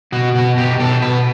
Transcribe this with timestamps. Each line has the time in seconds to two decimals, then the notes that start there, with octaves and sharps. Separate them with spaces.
0.12 B2 F#4
0.35 B2 F#4
0.57 B2 G4
0.79 B2 A4
1.02 B2 B4